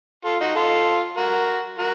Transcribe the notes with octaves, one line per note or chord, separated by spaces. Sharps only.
F4 A4
D#4 F#4
F4 A4
F#4 A#4
F#4 A#4